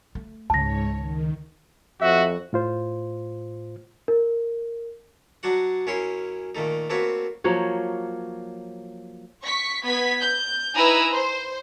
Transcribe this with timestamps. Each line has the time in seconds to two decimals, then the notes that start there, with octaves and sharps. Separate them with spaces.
0.15 A3
0.50 C#2 G#2 C#3 C#5 A5 A#6
0.97 D#3
2.02 F2 F#4 E5
2.53 A2 F4 C5
4.08 A#4
5.43 F#3 D4 F#4 F#5
5.87 F#2 C#4 E4 C#5 C6
6.55 A#2 D#3 A3 D#4
6.90 A3 A#3 C4 F#4 B4 C#5
7.44 F3 F#3 A#3 C#5
9.46 C#6 B6
9.85 B3 G#6 B6
10.21 G6
10.75 D#4 E4 B4 G#5 A#5 E6
11.12 C5